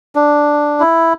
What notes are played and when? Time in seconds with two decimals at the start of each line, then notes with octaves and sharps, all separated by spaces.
0.15 D4
0.80 E4